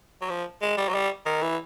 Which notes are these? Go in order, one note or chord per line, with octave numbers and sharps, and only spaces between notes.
F#3
F3
G#3
G3
F#3
G3
D#3
E3